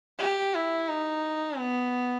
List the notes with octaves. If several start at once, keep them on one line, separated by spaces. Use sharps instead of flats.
G4
E4
D#4
B3